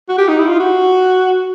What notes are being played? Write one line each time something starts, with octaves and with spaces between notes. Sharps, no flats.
F#4
G4
D#4
E4
F4
F#4